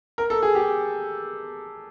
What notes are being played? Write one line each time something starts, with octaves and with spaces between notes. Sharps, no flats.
A#4
A4
G#4
G4